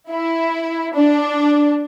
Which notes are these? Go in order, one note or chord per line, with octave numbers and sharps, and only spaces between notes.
E4
D4